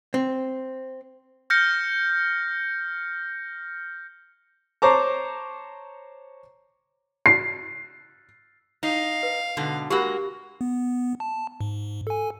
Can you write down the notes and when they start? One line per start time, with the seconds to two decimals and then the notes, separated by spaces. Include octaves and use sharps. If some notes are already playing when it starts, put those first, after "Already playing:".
0.14 C4
1.50 F6 G6 A#6 C#7
4.82 C5 C#5 A5 A#5 C#6 D6
7.26 C7
8.83 D#4 F5
9.23 B4
9.57 G#2 B2 D3
9.90 G#3 A#3 F#4 G4 A#4 B5
10.61 B3
11.20 A5
11.61 G#2
12.07 A4 G#5